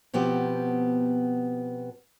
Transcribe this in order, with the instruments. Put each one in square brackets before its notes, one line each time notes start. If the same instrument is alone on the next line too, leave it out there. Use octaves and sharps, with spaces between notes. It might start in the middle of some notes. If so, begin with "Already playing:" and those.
[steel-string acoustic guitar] B2 F3 B3 C4 G4